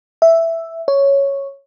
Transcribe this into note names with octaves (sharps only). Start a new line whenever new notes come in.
E5
C#5